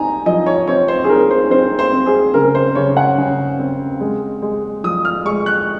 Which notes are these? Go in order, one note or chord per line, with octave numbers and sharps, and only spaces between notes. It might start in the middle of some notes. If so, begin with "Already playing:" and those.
Already playing: C4 D#4 G#5 A#5
F3 D#5
C#5
C4 C#5
C5
G#4
D#4 A#4
C5
C4 C5
C5
C4
G#4
C#3 A#4
C5
C#3 C#5
F#5
C#3
C4
G#3
G#3
F3 D#6
F6
G#3 C#6
F#6